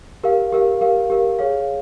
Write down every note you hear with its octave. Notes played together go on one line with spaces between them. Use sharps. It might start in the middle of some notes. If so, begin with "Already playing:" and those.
G4 A#4 F5
G4 A#4 F5
G4 A#4 F5
G4 A#4 F5
G#4 C#5 F5